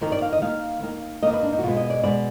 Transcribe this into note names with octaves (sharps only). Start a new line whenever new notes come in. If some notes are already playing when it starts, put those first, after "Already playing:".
D#3 A#3 A#4
D5
F5
D#5
D#3 A#3 F5
D#3 A#3
D#3 A#3 D#5
B4
D4
D#4
F#4
B2 G#3 B3 F4
D#5
D5
B2 G#3 B3 D5